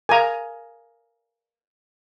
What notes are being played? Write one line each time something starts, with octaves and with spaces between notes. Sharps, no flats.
A#4 F5 G#5 A#5